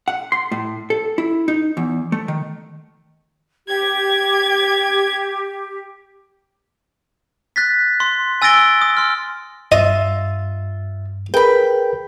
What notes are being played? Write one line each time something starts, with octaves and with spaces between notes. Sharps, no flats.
F#5
C6
A2
A4
E4
D#4
E2
A3
D#3
G4 G#6
F#6 A6 B6
C6
G#5 E6 A6 A#6 D7 G7
D#6
C6 F6
G2 F4 D#5 E5
G#4 A#4 B4 G5 B5